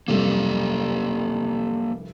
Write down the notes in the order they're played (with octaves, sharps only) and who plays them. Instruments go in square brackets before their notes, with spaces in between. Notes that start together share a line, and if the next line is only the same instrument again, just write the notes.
[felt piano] F1 C2 G2 [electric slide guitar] A#3 G4 A4